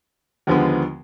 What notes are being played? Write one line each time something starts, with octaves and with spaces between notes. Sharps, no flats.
D#2 D3 F3 G#3 B3